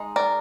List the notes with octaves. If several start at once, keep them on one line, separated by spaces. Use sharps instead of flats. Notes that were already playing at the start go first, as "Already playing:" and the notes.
Already playing: G#3 D#4
A#4 D5